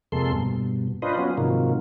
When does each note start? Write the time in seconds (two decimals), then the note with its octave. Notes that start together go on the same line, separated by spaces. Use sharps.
0.12 F2 C3 G#3 A#3 A4 C6
0.32 G2 B2
1.02 D4 F4 B4 C5 D#5
1.18 F#3 B3 C#4 F4
1.37 G#2 C3 D#3 F3 F#3 A#3